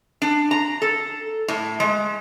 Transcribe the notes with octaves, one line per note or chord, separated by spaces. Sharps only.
D4
A#5
A4
A2
G#3